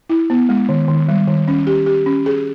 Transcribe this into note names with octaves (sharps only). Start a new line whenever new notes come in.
E4
B3
G#3
D#3
D#3
G3
D#3
C#4
G4
G4
C#4
G#4